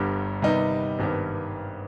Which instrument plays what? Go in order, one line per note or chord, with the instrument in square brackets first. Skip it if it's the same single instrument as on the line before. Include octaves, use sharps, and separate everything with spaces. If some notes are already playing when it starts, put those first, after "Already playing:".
Already playing: [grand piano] G1 G2 D3 G3
C3 D#3 G3 B3 D#4
G#1 G2 D#3 B3